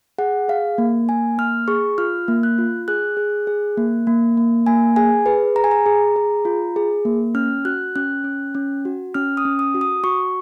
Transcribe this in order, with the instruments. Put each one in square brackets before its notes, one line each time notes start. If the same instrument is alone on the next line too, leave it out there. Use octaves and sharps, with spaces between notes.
[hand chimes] G#4 F#5
G#4 F5
A#3
A#3 G#5
A#3 F6
G#4 C#6
F4 F6
A#3
F#6
F4
G#4 F#6
G#4
G#4
A#3
A#3
A#3
A#3 G#5
G#4 G#5
G#4 B4
G#4 A#5
G#5
A#5
G#4
G#4
F4
G#4
A#3
C#4 F6
F#4 F#6
C#4 F#6
C#4
C#4
F#4
C#4 F6
D#6
C#4
D#6
F#4
D#6
F#4 C#6